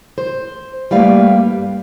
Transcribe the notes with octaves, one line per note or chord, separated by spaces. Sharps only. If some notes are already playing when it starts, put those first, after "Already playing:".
C5
G3 A3 A#3 B4 D5 F5
G2